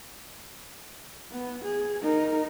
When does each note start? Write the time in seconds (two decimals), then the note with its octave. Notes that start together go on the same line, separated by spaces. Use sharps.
1.32 B3
1.64 G#4
2.02 D#4 A#4